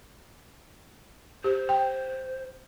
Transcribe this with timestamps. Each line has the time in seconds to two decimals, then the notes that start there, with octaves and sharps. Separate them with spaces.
1.44 G4 C5
1.69 G5